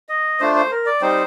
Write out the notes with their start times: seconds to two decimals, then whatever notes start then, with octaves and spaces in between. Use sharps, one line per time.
0.09 D#5
0.40 A3 D4 F4 C5
0.55 C5
0.71 A#4
0.86 D5
1.01 G3 C4 D#4 C5